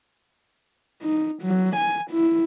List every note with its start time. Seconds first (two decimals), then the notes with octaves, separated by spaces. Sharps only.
1.03 D#4
1.43 F#3
1.76 G#5
2.12 E4